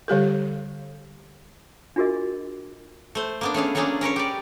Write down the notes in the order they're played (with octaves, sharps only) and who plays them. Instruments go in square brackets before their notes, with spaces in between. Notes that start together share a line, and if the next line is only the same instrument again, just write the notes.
[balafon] D3 G3 G4 A4
[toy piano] D4 F4 F#4 G#4 A#4 D#5
[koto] A3 C5
A#3 B3 D4
A3 C#4 G#4 F5
F#3 A3 A#3 C#4 D4 G#4
C#4 A#4 B4 C#5
G4 D5